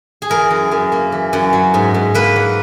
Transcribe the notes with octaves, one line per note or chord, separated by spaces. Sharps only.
G#4
E3 A#4
F#2
F#2
A#3
E3
F#2
F#3
G#2
G#2
A#3 B4
F#3